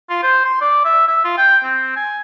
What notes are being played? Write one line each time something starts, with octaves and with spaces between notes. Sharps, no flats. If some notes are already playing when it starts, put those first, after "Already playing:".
F4
C5
C6
D5
E5
E5
F4
G5
C4
G#5